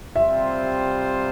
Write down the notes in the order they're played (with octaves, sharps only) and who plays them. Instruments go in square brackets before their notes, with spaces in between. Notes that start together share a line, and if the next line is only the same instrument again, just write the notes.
[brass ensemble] C3 G3 C4 F4 C5 [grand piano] E5